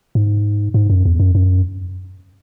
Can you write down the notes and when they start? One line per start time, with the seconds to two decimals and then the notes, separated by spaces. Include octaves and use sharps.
0.15 G#2
0.74 G#2
0.90 F#2
1.05 E2
1.20 F#2
1.35 F#2